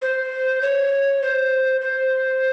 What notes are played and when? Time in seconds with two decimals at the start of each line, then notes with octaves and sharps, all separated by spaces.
0.02 C5
0.62 C#5
1.22 C5
1.81 C5